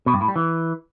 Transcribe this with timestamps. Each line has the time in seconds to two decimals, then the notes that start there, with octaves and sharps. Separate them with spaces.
0.06 B2
0.14 G2
0.21 A2
0.28 G3
0.36 E3